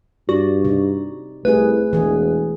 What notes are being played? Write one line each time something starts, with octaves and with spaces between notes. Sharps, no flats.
G2 F#4 D5
C3 D#4
C2 A3 E4 G#4 B4
E1 E3 G#4